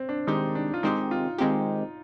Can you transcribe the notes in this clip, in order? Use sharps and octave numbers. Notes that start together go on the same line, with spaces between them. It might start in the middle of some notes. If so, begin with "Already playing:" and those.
Already playing: C4
D4
D#3 G#3 C4 D#4 G4
D4
F4
D#3 G#3 C4 D#4 G4
F4
D#3 G#3 C4 D#4 G4